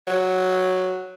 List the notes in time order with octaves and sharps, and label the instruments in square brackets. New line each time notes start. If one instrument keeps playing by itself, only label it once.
[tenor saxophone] F#3